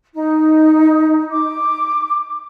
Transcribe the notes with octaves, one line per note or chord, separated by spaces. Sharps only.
D#4
D6